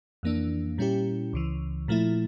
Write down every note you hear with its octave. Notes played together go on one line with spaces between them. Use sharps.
F2 E3 A#3 D4
A#2 G3 C#4 E4 G4
C#2 C#3 E3
A#2 F3 A3 E4